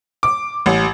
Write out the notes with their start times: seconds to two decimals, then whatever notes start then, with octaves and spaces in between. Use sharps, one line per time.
0.23 D6
0.66 A1